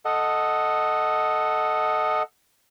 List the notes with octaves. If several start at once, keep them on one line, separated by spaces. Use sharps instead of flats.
A4 D#5 F#5